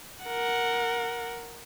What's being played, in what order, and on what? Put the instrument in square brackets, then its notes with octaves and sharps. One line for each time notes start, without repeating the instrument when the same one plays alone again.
[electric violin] A#4 F#5